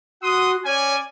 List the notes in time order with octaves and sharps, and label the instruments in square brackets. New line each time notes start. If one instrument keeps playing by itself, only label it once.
[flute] F#4 [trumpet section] F#5 C6 D#6
[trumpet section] C#4 D5 G#5 [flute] C#5